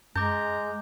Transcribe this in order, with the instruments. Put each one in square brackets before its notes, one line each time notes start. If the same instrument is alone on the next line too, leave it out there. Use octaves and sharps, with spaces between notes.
[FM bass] F#2 [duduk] G#3 [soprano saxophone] A#5 [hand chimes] D6 G6